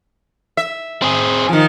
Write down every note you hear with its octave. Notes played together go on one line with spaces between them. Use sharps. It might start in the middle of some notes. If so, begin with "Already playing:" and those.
E5
C4 G#4
D#3 F3